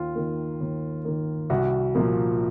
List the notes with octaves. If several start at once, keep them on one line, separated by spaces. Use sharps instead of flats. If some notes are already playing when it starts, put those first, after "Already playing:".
Already playing: D#2 F4
D#3 A#3
D#2
D#3 A#3
C2 F#4
A#2 F3 A#3